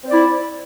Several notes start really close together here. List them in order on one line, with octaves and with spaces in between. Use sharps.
C4 D5 E4